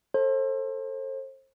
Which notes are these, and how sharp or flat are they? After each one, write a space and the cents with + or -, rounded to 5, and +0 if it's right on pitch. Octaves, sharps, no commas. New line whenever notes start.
A4 +20 C5 +35